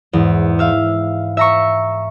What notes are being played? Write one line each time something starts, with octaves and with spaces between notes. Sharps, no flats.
E2 G#2
E5 F5
E5 A#5 C#6